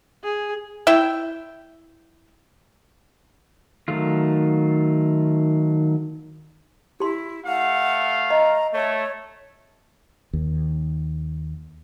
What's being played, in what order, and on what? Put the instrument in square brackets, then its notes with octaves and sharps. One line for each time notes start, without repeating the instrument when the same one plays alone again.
[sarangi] G#4
[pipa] E4 E5 G5
[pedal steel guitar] D#3 F#3 A3 F4
[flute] E4 [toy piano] G4 C6
[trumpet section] A3 F5 [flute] F#5
[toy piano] D#5 [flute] A#5
[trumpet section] A3 [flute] C#5
[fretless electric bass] D#2